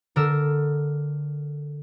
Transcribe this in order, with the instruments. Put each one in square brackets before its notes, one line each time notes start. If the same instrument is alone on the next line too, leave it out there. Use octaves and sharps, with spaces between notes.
[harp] D3 A#4 E6